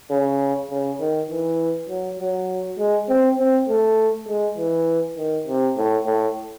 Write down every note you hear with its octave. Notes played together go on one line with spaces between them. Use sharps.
C#3
C#3
D#3
E3
F#3
F#3
G#3
C4
C4
A3
G#3
E3
D#3
C3
A2
A2